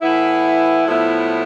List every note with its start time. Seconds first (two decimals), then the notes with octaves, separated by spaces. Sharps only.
0.02 A2 E3 B3 E4
0.86 A2 F3 B3 E4